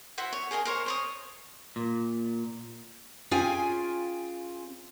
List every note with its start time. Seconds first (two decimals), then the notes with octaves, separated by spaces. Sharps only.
0.18 E4 F#4 C5 E5
0.33 C#5
0.51 G#4 A#4 D#5 G#5
0.65 A#4 C5 C#5
0.86 C5 C#5 D#6
1.76 A#2
3.31 C#4 F4 G#4 F5 G5 G#5